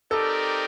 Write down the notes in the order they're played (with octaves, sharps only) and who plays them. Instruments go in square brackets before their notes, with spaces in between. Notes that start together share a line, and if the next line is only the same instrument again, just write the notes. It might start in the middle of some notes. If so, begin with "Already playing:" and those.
[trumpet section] C4 D#4 G4 A#4 D5 [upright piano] A4